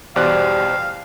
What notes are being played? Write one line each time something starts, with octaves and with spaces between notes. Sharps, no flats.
E2 B2 G3 C5 D5 F5 D6 F#6